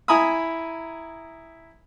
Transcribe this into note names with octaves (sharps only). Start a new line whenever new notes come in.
E4 G#5 A#5 B5 D#6